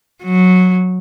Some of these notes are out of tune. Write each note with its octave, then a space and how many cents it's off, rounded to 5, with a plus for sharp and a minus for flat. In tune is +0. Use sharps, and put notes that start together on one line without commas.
F#3 -15